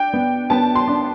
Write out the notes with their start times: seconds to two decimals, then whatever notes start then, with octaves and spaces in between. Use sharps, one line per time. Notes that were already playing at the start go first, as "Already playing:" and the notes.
Already playing: D4 G5
0.13 B3
0.50 B3 A5
0.75 C6
0.88 D4